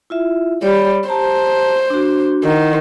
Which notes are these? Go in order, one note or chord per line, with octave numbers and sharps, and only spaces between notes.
E4 F4 E5
G3 C#5 B5
G4 C5 A5 A#5
D4 F#4
D#3 E4 F#5 A#5